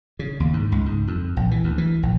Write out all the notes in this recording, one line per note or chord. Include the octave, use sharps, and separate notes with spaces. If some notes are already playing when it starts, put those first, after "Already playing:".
C#3
D#2
G#2
C#2
G#2
F2
A#1
E3
D2
E3
A#1